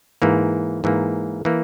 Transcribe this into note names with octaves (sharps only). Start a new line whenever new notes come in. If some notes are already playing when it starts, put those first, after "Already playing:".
G#2 E3 A#3
G#2 E3 A#3
E3 A#3